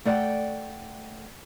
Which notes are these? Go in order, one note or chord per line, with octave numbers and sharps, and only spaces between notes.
A3 D5 F#5 G5